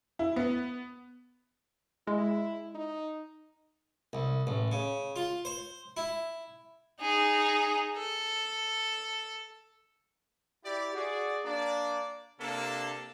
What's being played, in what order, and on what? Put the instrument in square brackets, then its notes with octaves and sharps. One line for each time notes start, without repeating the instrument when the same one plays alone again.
[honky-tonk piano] E4
B3
[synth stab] G#3 [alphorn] E4
[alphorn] D#4
[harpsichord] C2
A1
C#3
F4
C5
E4
[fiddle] D#4 G#4
A4
[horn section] E4 G4 D5
F#4 G#4 D5
A#3 D4 D5
C3 A#3 D4 A4